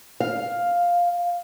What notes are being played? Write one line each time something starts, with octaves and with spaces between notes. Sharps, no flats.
F5